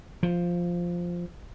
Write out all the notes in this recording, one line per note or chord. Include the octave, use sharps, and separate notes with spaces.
F3